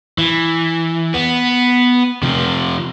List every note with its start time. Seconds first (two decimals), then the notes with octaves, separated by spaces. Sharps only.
0.18 E3
1.14 B3
2.23 C3 F3